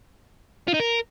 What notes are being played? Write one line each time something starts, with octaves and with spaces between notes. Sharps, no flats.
F4
D#4
A#4